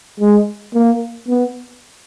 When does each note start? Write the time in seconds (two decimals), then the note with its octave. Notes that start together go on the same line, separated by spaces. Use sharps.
0.20 G#3
0.74 A#3
1.28 B3